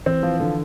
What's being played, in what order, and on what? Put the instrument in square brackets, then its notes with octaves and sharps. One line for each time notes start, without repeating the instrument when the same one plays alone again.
[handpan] E3 [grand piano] C4
[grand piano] F3
D3